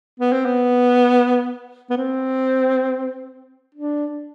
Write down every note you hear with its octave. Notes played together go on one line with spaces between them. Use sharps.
B3
C4
B3
B3
C4
D4